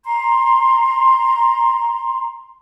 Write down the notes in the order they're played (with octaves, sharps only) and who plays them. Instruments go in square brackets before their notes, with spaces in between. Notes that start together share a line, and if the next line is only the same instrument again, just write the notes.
[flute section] A#5 C6